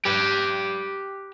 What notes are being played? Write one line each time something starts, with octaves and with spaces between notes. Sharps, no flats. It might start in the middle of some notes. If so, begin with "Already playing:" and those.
G4 B4